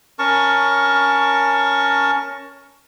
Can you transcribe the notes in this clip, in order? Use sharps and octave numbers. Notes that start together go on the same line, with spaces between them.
C#4 A#4 A5 C#6